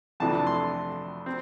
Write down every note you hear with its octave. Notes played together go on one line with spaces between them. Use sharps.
F2 C3 E3 A3 D4 A5
C6
C4